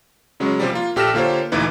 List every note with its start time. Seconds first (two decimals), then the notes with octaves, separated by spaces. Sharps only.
0.40 C#3 F#3 G#3 C#4
0.60 C3 F3 G3
0.72 A#3 F4
0.96 A#1 G4 A4 F6 A#6 E7
1.14 D3 A#3 F4 G4 C5 C#5
1.52 D2 A#2 E3 D#4 B4